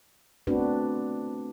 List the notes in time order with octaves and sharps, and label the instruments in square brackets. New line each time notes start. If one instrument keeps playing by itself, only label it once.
[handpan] A3 B3 C4 D4 F#4 B4